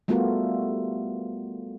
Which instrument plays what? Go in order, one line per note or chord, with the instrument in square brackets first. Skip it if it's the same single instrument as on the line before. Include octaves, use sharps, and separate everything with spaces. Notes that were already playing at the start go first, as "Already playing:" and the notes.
[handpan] G3 A3 B3 F4 F#4 A#4